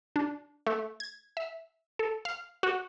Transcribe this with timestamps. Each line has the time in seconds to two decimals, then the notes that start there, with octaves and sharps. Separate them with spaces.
0.16 D4
0.67 A3
1.00 G#6
1.37 E5
1.99 A4
2.25 F5
2.63 F#4